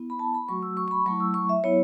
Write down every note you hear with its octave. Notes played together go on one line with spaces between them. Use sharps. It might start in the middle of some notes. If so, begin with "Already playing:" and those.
Already playing: B3 E4
B5
A5
B5
F#3 A3 F#4 C#6
E6
C#6
C#6
B5
F#3 A3 E4 C#6
E6
C#6
E5
F#3 B3 E4 C#5